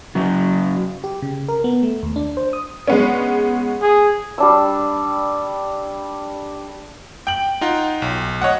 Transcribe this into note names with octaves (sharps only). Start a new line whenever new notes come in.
C#3 F#3
G4
C#3
A#4
B3
A3
D#2
D4
C5
D#6
G#3 B3 C#4
G#4
G3 D4 E6
G5 F#7
D#4 F4 F#5
B1
C#5 D#5 F#5